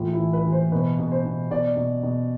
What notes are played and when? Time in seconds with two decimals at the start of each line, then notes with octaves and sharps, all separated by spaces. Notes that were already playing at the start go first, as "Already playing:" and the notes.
Already playing: A2 E3 F4
0.13 E4
0.19 E3
0.33 B4
0.46 E3
0.52 C5
0.72 B2 B4
0.99 B2
1.11 C5
1.25 B2
1.50 B2 D5
1.76 B2
2.03 B2